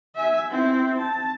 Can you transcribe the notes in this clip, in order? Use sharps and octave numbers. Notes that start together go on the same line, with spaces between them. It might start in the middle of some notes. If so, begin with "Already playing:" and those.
E5 G#5
C4 E4
A5